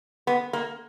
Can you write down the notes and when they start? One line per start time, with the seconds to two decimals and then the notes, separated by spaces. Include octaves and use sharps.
0.27 B3
0.53 A#3